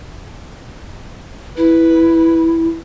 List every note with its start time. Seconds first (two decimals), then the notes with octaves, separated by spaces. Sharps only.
1.57 E4 B4